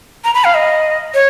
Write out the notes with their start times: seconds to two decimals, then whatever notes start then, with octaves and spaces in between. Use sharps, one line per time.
0.24 A#5
0.34 B5
0.44 F5
0.54 D#5
1.14 C#5